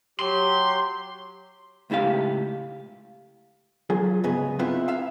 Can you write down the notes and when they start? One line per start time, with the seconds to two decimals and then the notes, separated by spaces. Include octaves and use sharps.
0.20 F#3 G4 C6
1.90 C#2 A2 E4 G4 F5
3.90 F#3 F4 G#4
4.24 C2 G#2 C#3 B3 G#4 D#5
4.59 B3 C4 E4 F4 B4
4.88 E5 F5